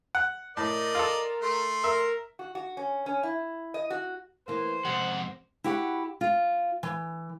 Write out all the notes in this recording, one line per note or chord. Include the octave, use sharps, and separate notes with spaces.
F#5
A2 A#4 D5 D#5
F4 A4
A3 C6
A#4 E5
F#4
F#4
C#4
C#4
E4
D#5
F#4
E3 A#3 C5
F2 G#2 C3 F#5
E4 F#4 G4 F#5
F4
E3